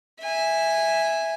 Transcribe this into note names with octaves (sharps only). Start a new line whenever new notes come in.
E5 G#5